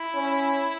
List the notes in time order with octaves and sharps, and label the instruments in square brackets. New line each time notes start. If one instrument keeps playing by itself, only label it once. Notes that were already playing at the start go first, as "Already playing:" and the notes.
Already playing: [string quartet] E4
[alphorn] C#4